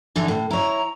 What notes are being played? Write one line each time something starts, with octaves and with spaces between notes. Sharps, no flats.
D3 E3 D#4
A2
E4 C#5 A#5